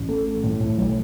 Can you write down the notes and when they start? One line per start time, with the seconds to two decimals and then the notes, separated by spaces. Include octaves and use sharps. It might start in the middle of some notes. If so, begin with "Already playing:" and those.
Already playing: A1
0.08 A3
0.26 A3
0.43 A2
0.60 A2
0.78 B1